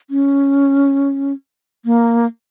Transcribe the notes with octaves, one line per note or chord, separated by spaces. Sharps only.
C#4
A#3